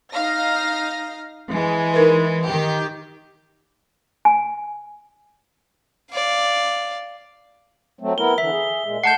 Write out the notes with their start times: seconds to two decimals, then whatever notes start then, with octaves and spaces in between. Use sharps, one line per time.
0.13 D#4 F5 A#6
1.51 E3 G#3
1.94 D#4 A#4 B4
2.46 D#3 G4
4.25 G#5
6.11 D5 F5
7.99 F#3 A3 C4
8.18 B3 E4 A#4 G7
8.38 D3 E3 E5
8.51 G#4
8.84 A#2 G#3
9.03 A3 F#5 A5 G6 C7